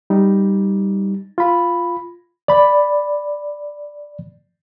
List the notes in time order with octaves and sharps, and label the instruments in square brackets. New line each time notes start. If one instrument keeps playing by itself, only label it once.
[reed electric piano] G3 D#4
F4 B5
D5 B5